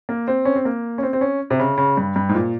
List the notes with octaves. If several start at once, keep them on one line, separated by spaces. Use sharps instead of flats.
A#3
C4
C#4
C4
A#3
C#4
C4
C4
C#4
C3
C#3
C#3
G2
G2
G#2
A#2